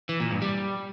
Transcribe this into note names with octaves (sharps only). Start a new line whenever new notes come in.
E3
A#2
G2
G3